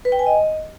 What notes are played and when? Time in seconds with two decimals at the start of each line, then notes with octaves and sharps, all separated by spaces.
0.05 B4
0.12 G5
0.19 G#5
0.26 D#5